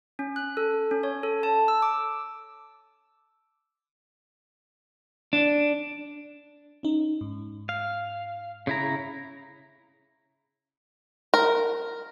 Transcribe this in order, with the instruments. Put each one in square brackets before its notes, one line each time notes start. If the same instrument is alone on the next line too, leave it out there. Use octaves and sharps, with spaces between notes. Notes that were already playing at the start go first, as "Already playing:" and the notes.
[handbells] C#4
F#6
A4
C#4
C#5
A4
A5
E6
D6
[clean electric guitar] D4
[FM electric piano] C#4 D#4
G#2
[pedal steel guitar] F5
C#3 E4 A#5
[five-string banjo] A#4